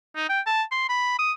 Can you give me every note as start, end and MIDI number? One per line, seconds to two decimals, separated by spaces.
0.16 0.29 63
0.29 0.40 79
0.46 0.62 81
0.72 0.87 84
0.89 1.19 83
1.19 1.32 87